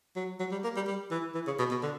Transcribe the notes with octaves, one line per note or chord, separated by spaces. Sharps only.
F#3
F#3
G3
A#3
G3
G3
E3
E3
C#3
B2
B2
D3